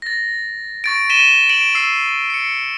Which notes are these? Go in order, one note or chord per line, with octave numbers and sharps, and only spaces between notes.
A6 A#6
C#6 A6 D7
B6 D#7 E7 G7
D7 F#7
E6 C7
C7 C#7